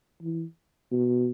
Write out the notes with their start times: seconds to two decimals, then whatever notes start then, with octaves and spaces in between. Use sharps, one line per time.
0.23 E3
0.91 B2